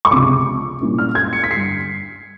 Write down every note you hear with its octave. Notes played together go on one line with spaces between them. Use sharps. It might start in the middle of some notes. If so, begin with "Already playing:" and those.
C#6
C#2 C3 F3 G#3 D6
A#2 G3 A#3 C#4 E4
F6
G#6
C#7
B6
G2 D3 G3 C7